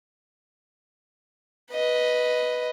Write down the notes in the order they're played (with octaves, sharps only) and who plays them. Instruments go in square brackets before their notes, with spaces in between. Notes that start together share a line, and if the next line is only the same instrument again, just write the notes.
[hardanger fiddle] B4 D#5